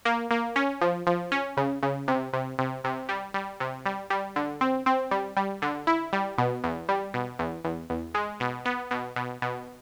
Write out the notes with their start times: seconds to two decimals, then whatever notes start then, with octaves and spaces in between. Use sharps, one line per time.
0.05 A#3
0.31 A#3
0.56 C#4
0.81 F3
1.07 F3
1.32 C#4
1.57 C#3
1.83 C#3
2.08 C3
2.33 C3
2.59 C3
2.84 C3
3.09 G3
3.34 G3
3.60 C3
3.86 G3
4.10 G3
4.36 D3
4.61 C4
4.86 C4
5.11 G3
5.37 G3
5.62 D3
5.87 E4
6.13 G3
6.38 B2
6.64 E2
6.89 G3
7.14 B2
7.39 E2
7.64 E2
7.90 E2
8.14 G#3
8.40 B2
8.65 B3
8.91 B2
9.16 B2
9.42 B2